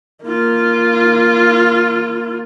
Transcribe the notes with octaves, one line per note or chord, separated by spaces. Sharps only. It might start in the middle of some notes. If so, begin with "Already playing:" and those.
A#3 F4